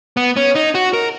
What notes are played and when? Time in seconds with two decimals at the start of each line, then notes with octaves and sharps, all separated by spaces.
0.17 B3
0.36 C#4
0.55 D#4
0.75 F#4
0.93 A#4